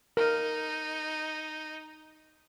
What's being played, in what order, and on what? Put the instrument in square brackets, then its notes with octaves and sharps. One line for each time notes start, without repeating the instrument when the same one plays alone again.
[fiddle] D#4 [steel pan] A#4